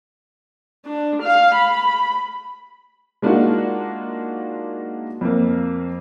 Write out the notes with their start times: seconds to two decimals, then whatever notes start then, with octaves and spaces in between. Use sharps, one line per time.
0.85 D4
1.22 F5
1.55 B5
3.22 G#3 A#3 D4 D#4 F4 F#4
5.21 F2 A#3